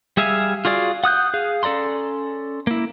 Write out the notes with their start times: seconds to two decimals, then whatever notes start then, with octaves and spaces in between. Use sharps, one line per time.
0.17 G3 G#4 E5 F5 G#5
0.65 F4 F#4 G#4 D5 F5
1.04 F#5 D#6 F#6 G6
1.34 G#4 F5
1.63 C#4 A4 D5 A#5 C6
2.67 A#3 E4